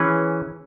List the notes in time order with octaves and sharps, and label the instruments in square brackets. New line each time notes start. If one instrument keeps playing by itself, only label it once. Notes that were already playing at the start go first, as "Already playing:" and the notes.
Already playing: [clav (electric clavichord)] E3 C#4 G#4 B4